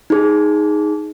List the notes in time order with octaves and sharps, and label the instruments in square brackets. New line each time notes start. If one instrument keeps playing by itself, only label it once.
[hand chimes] D#4 G#4